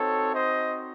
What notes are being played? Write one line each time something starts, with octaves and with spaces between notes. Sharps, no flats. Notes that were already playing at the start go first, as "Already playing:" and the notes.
Already playing: C4 D#4 F#4 A4 C#5
C5 D#5